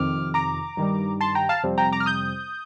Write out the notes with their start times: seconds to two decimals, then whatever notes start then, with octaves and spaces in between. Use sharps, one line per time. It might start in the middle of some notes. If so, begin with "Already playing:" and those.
Already playing: F2 C3 D#3 D6 F6
0.34 A#5 D6
0.77 G2 D#3 G3
1.21 A5 C6
1.35 G5 A#5
1.49 F5 A5
1.64 F2 C3 G3 C4
1.78 G5 A#5
1.92 A#5 D6
2.00 F6
2.06 D#6 G6